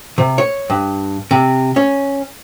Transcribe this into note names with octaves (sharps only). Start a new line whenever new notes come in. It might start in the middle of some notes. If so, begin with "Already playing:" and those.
C3
C#5
G2
C3
C#4